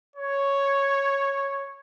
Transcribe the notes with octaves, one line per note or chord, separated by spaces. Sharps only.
C#5